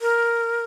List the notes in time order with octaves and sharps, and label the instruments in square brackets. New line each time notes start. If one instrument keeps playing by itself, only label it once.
[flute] A#4